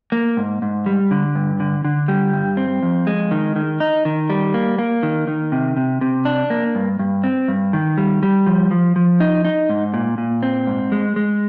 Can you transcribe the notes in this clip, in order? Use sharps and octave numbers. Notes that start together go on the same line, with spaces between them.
A#3
G#2
G#2
G3
D3
G2
D3
D3
G3
G2
C4
F2
G#3
D#3
D#3
D#4
D#3
G3
A#3
A#3
D#3
D#3
C3
C3
C3
D4
A#3
G2
G2
C4
G2
D#3
G3
G3
F3
F3
F3
D#4
D#4
G#2
A#2
A#2
C4
G#2
G#3
G#3